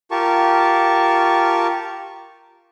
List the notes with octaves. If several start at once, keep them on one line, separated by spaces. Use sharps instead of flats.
F4 G4 A#4 A5 C#6